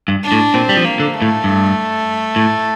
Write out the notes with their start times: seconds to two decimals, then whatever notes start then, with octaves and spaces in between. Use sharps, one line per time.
0.08 G2
0.23 D4
0.32 A2
0.54 A#2 C4
0.69 G3
0.77 F3
0.84 A#3
1.00 D3
1.14 A3
1.22 A2
1.44 G2
2.36 A2